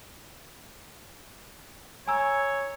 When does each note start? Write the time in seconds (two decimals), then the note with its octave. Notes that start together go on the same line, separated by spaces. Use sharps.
2.08 C#5 G#5 A#5 E6